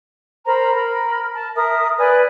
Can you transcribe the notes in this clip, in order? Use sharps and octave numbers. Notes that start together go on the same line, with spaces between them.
A#4 C5 A#5 B5
A#4 B5
A5
A#4 E5 D#6
B4 D5 G#5